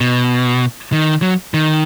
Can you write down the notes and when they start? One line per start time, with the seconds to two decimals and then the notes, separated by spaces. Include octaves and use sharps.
0.01 B2
0.92 D#3
1.22 F#3
1.54 D#3